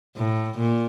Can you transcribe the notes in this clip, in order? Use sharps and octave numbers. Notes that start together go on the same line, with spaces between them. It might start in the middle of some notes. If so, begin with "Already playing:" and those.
A2
A#2